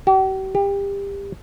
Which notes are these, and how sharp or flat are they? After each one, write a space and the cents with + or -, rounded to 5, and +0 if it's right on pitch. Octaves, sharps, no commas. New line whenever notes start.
G4 -45
G4 +25